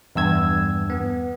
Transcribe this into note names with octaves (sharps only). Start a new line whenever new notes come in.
E2 G2 E6 G#6
B3